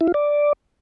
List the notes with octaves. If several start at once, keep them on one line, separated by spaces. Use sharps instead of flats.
E4
F4
D5